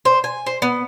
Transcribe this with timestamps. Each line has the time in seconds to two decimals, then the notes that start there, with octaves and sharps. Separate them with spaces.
0.05 C5
0.24 G#5
0.47 C5
0.62 B3